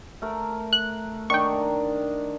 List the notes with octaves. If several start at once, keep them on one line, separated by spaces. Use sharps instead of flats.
A3 A#4
F#6
D#3 D4 G5 C#6
A#5